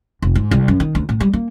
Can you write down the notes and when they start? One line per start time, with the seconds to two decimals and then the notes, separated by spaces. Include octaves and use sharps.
0.22 F1
0.35 G#2
0.51 C2
0.68 F#2
0.80 D#3
0.95 D2
1.09 A2
1.20 G3
1.33 A#3